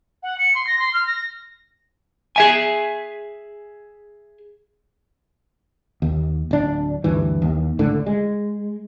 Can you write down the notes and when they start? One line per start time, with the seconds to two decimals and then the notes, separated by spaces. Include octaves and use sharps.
0.23 F#5
0.38 C#7
0.55 C6
0.67 A#6
0.79 C6
0.93 F6
1.07 A#6
2.36 G#4 E5 G#5
6.02 D#2
6.51 D1 D4
7.04 D2 G2 E3
7.42 D#2
7.79 C#2 A2 D3
8.06 G#3